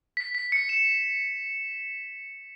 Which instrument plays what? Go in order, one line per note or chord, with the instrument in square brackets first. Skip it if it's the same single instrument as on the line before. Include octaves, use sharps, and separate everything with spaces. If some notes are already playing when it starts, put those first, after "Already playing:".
[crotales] B6
B6
C#7
E7